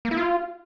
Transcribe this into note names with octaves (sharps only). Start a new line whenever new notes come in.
A#3
E4
F4